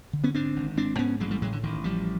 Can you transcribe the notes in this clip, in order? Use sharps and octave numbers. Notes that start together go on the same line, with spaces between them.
D3
B3 C#4
G#2 C4 D4
G#1
G#2 C4 D4
G#2 B3 C#4
A1 F#3 G#3
G3 A3
A2 F#3 G#3
D3
A1 D#3
A1 F3 G3